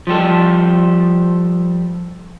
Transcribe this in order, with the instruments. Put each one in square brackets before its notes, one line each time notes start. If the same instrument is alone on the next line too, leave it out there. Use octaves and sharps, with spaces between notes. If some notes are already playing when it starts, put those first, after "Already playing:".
[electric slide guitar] F3 G3 A4